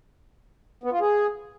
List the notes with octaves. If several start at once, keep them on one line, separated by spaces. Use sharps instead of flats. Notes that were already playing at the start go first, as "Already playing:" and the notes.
B3
F4
G#4